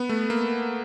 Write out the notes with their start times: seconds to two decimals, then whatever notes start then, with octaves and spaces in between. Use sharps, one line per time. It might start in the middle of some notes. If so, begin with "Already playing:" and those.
Already playing: B3
0.09 A3
0.30 A#3